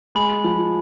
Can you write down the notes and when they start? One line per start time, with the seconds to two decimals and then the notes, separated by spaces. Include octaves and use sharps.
0.15 G#3 B5
0.44 F3